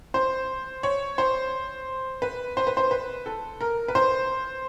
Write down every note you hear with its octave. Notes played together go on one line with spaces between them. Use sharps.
C5
C#5
C5
B4
C5
B4
C5
B4
A4
A#4
B4
C5